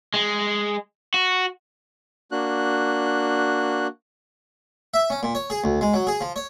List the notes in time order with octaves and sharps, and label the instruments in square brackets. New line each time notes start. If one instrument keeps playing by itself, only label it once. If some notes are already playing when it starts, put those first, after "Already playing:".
[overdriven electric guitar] G#3
F#4
[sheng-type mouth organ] A#3 D4 F#4 F#6
[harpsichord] E5
C#4
A#2
C#5
G#4
D2
G#3
F#3
G#4
F3
C#5